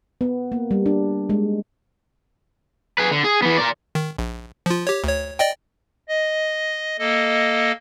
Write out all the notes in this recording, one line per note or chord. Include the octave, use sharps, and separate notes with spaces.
B3
A#3
G3
D4
G#3
G#4 B4
D3
G#4
E3 B3
A#4 D5
D#3
A#1
F3 F4
G4 C#5
D2 C#5
D5 D#5 G5
D#5
A#3 A4 D#5